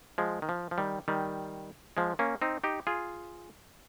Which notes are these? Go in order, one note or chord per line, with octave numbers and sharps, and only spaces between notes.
F3 G#3
D#3
F3
F3
D#3 G3
D#3 G3
F3 G#3
A#3 C#4
C4 D#4
D#4 G4
F4 G#4